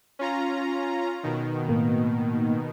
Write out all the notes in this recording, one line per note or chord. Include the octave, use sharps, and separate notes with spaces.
C#4 F4 A#5
B2 D#3
A2 A#3 B3